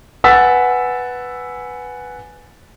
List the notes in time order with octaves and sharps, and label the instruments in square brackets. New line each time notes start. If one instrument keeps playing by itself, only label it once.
[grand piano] B4 F#5 G#5 E6 A6 B6